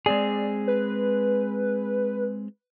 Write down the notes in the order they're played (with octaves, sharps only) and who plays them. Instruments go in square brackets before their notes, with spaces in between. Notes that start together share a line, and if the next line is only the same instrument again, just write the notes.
[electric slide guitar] G#3 C4 G#4 [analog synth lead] D5
[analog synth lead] B4